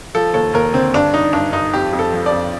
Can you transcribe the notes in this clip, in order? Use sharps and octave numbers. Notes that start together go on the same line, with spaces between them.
F3 A4
D#2 A4
D#2 A#4
D3 C4
G2 D4
G2 D#4
G2 D4
G2 D#4
F2 G4
F2
A4
F3
D5
F2